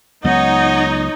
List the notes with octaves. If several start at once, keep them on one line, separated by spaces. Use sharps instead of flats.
C#2 F#3 B3 D#4 C#5 D#5 F#5